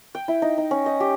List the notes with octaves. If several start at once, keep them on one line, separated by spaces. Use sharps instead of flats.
G5
E4
D#4
D#4
C#4
D#5
G4